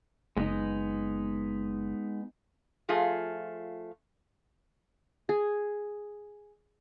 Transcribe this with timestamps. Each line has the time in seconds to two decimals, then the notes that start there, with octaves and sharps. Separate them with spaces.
0.37 F#1 G#3 B3 D#4
2.89 F3 A3 F4 G#4
5.29 G#4